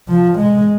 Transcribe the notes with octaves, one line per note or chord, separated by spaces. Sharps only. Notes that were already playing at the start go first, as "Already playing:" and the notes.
F3
G#3